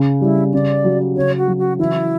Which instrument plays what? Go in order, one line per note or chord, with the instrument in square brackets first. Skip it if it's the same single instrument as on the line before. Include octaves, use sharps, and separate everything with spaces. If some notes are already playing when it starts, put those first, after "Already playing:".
Already playing: [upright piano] C#3
[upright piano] G3 [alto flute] E4
[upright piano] C#3 [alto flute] D5
[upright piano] F#3
[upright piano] C#3 [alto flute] C#5
[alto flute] F#4
[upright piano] F#3
[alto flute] F#4
[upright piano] E3 [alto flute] E4